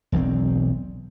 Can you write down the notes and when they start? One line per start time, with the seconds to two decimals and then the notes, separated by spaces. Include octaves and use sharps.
0.12 E1 B1 F#3 C4